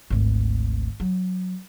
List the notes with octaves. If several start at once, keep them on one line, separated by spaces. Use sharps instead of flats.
G#1 D2
F#3